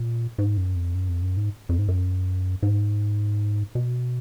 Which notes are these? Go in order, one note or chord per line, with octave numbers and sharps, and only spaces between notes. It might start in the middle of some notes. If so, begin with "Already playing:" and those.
Already playing: A#2
G#2
F#2
F2
F#2
F2
F#2
G#2
F2
G#2
F#2
G#2
B2